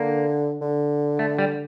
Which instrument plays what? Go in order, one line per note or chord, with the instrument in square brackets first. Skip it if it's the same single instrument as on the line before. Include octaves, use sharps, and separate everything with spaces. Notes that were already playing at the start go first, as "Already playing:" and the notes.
Already playing: [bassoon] D3 [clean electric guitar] A#3
[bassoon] D3
[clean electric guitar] A3
G3